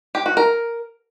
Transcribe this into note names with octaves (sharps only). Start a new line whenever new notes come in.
G4
F#4
A#4